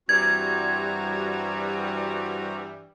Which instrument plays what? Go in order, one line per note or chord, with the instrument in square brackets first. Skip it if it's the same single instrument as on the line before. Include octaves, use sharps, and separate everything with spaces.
[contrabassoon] G2 [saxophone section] E3 G3 [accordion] C4 F#4 A#5 [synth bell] G#6